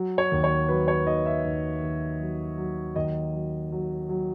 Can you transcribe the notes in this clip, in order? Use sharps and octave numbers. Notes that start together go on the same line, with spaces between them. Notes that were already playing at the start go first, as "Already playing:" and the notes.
Already playing: F#3
C#5
D#2
C#5
F#3 B4
C#5
D#3 D#5
E5
D#2
D#2
F#3
F#3
D#2 D#5
F#3
F#3
F#3